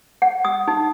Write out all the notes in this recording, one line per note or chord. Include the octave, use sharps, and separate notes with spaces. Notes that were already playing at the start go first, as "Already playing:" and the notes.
F#5
D#6
D#4